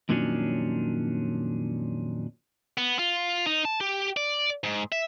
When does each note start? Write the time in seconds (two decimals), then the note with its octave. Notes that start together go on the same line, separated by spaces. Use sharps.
0.09 F2 A#2 D#3 F#3 C#4 D4
2.78 B3
2.99 F4
3.47 D#4
3.65 A5
3.81 G4
4.17 D5
4.64 G#2
4.92 E5